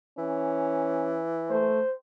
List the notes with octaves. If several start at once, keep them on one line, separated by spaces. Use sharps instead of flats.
E3 C#4
A3 C5